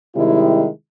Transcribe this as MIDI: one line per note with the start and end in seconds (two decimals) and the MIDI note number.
0.15 0.67 48
0.15 0.67 51
0.15 0.67 55
0.15 0.67 56
0.15 0.67 64